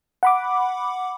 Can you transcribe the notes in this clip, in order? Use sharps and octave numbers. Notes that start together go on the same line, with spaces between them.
F#5 B5 D6